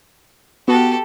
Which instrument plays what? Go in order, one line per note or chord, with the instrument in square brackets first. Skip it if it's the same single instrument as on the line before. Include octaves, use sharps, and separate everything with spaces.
[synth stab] B3 F#4 [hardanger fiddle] G4 A4